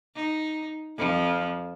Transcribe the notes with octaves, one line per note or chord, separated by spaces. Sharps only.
D#4
F2 F3